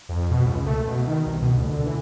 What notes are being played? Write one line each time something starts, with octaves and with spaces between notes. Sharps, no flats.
F2
B2
C#2
A3
B2
D#3
C2
B2
D2
D3
E3